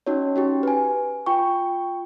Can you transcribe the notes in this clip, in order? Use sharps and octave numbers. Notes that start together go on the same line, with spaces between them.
C#4 D#4 F#4 C#5
C#4 F#4 G4
B4 G#5
F4 G5 C#6